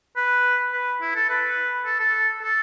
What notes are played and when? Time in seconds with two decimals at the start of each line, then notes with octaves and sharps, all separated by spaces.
0.16 B4
0.73 B4
1.01 E4
1.15 A4
1.29 B4
1.85 A4
2.00 A4
2.43 A4